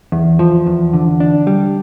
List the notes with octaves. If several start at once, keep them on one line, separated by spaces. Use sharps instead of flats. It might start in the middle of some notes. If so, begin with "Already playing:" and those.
E2
F3
E2
D3
D4
G3